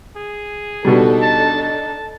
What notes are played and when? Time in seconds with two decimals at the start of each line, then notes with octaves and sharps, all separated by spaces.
0.16 G#4
0.85 B2 G3 D4 D#4 A4
1.22 A5
1.63 A5